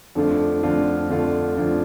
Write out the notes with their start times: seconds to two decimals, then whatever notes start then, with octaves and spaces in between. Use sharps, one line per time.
0.15 F2 D3 A3 D4 F4
0.63 F2 D3 A3 D4 F4
1.10 F2 D3 A3 D4 F4
1.57 F2 D3 A3 D4 F4